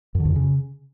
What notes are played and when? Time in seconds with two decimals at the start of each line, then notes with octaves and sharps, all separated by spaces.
0.15 F#2
0.20 D3
0.25 E2
0.30 F2
0.36 C#3